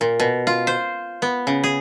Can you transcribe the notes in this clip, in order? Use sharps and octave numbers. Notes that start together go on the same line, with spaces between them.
A#2
B2
F4
C5
B3
C#3
G#4